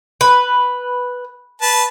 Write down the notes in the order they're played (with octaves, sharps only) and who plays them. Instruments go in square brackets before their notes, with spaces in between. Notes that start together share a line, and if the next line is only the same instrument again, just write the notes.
[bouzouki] B4
[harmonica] B4 A5